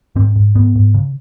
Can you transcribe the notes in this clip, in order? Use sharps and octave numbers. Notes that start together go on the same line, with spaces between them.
G#2 C4
G#2
G#2 B3
G#2
C#3